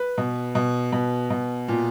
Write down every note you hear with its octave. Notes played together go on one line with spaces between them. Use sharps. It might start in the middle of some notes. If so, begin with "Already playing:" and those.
Already playing: B4
B2
B2
B2
B2
A#2